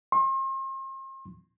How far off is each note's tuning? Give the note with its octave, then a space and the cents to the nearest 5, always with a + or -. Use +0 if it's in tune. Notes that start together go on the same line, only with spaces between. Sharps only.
C6 +40